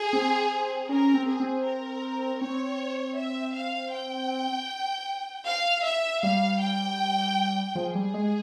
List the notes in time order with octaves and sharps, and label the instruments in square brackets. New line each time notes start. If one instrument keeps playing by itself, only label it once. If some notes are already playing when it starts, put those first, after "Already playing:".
Already playing: [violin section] G#4
[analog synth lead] C4
[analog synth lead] C#4 [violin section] A#4
[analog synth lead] C4
[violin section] G#4
[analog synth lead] C4
[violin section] A#4
[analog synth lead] C4 [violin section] C#5
[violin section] E5
F5
G5
F5
E5
[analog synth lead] G3 [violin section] F5
[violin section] G5
[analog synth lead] F3 [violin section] G#4
[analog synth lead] G3
G#3